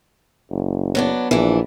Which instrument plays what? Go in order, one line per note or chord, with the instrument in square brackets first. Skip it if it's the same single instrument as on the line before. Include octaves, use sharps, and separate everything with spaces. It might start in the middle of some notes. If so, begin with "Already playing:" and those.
[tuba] F#1
[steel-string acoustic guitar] F#3 B3 D4
[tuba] A#1 [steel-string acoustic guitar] E3 D4